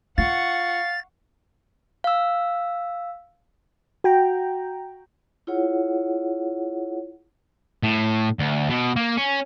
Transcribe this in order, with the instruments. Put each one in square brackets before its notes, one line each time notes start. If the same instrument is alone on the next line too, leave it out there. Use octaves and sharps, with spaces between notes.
[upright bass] F4 [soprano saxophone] F5 [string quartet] F#5 C#6 [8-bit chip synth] A6
[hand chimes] F5 E6
[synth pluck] F#4 G5 A#5
[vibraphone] E4 F4 G#4 C#5 F#5
[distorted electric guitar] A2
D2
B2
A#3
C#4